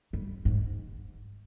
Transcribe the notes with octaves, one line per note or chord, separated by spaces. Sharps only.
G2
G#2